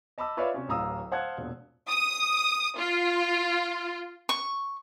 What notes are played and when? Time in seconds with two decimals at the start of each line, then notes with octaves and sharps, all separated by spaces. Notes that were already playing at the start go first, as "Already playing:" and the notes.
0.18 D#5 A5 B5 D6 E6
0.37 F4 B4 C#5 D5 E5 F5
0.54 C3 C#4
0.68 D1 A1 F5 A#5 D#6 E6
1.12 C5 F5 F#5 A5 F#6 G#6
1.37 E1 A#1
1.88 D#6
2.77 F4
4.29 C#6